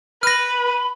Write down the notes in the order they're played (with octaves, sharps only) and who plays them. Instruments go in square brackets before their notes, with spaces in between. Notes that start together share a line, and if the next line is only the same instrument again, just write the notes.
[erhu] B4 [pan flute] B5 [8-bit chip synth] F6 A#6